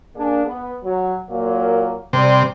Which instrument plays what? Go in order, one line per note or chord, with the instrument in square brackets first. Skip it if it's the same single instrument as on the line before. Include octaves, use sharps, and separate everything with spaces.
[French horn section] A#3 D4 G#4
B3
F#3
A#2 F#3 A#3
[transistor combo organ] C3 [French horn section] G3